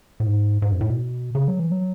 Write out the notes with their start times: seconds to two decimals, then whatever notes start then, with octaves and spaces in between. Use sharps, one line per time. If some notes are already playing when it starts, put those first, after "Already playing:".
0.20 A2
0.27 G#2
0.62 G#2
0.72 F#2
0.81 A2
0.90 B2
1.35 C#3
1.48 F#3
1.60 E3
1.72 F#3